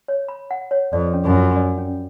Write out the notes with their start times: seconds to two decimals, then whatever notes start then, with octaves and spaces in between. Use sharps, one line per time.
0.08 C#5
0.28 B5
0.51 F#5
0.71 C#5
0.93 F2 D5
1.14 C#4
1.25 F#2
1.35 F4
1.56 D5
1.78 C#4